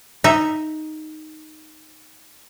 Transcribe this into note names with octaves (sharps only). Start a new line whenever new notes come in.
D#4 E5